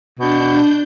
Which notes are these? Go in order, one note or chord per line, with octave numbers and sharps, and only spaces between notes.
B2 D4 G6